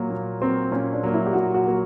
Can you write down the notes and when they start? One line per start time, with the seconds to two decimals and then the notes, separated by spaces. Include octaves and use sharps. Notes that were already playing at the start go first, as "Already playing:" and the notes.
Already playing: A#2 F#3 A#3
0.10 A#2
0.41 F#3 A#3 C4
0.71 A#2 C#4
0.93 D4
1.03 F#3 A#3
1.14 E4
1.26 G4
1.33 A#2 F#4
1.54 F#4
1.64 F#3 A#3